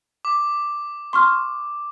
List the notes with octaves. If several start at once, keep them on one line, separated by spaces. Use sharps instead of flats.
D6
C6 C#6 F6